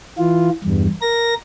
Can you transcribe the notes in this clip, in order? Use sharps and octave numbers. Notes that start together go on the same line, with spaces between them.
E3 F4
E2 G2
A#4 A#6